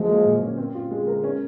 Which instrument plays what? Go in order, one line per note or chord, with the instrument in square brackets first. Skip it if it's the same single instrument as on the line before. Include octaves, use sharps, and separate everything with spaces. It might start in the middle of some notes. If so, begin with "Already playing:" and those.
Already playing: [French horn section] F3 G#3 [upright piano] F#3
[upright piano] A#3
A#2
C#4
C4
F4
G#3
A#4
C#4